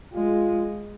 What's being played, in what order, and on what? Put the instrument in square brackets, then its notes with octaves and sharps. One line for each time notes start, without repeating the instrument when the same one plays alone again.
[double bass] G#3 [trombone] F4